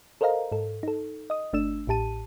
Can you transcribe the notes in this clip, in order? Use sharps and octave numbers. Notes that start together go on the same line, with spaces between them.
A4 A#4 C5 D#5 F5 A#5
G#2 A4
D#4 A4
D#5 D#6
G1 A3 D4 E6 E7
A1 A2 G4 A5 D#7